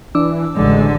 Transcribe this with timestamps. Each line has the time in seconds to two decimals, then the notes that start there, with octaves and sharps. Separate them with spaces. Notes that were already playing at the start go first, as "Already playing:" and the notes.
0.15 E3 D4 D6 E6
0.56 A1 D3 G#3